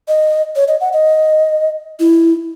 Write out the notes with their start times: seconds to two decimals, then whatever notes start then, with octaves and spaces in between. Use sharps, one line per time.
0.08 D#5
0.56 C#5
0.68 D#5
0.81 F#5
0.93 D#5
2.00 E4